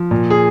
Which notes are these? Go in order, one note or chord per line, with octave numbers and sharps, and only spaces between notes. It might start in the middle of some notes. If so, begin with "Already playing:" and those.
Already playing: F3
A#2
G#4